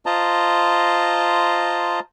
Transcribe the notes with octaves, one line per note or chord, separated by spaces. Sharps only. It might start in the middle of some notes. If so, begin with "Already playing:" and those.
F4 C5 D#5 A5 A#5